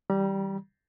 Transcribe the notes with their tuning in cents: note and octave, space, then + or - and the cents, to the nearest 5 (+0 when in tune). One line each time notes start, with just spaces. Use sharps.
E3 -35 G3 -5 A#5 +45